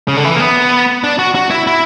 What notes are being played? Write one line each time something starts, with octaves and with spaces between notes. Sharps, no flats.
C#3
D3
E3
A#3
B3
D4
F#4
F#4
E4
E4